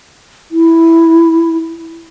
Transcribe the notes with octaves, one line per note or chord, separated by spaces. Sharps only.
E4